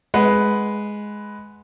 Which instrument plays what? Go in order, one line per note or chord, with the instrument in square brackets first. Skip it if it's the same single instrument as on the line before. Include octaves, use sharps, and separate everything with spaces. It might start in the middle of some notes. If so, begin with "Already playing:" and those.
[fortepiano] G#3 B4 F#5